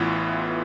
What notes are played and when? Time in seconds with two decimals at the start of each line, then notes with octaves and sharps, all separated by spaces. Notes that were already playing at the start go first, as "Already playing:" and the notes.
Already playing: A1 A2 E3 B3 E4 F4